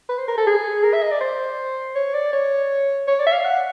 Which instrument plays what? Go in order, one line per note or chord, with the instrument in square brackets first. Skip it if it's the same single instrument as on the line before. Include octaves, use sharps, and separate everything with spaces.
[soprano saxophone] B4
C5
A#4
A4
G#4
A#4
E5
D#5
D5
C5
C#5
D5
C#5
C#5
D5
E5
F5
F#5